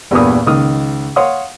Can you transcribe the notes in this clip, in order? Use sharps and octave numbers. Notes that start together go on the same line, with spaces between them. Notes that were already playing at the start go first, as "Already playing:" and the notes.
E2 G2 A#2 B3 D#6
C#2 D#3 D#6 F6
C#5 F5 F#5 C6 D#6